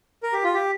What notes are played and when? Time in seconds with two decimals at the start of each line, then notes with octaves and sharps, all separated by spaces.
0.23 A#4
0.33 G4
0.44 F4
0.54 G4